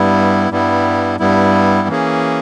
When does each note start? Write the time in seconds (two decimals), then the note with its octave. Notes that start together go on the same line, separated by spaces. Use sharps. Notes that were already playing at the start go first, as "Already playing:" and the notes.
Already playing: G2 G3 B3 E4
0.51 G2 G3 B3 E4
1.19 G2 G3 B3 E4
1.88 E3 A#3 C#4 G#4